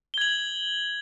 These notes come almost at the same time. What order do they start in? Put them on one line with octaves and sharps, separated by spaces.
G7 G#6 F#7